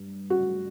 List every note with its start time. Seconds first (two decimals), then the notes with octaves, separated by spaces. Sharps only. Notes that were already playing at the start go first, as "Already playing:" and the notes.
Already playing: G2
0.30 F#4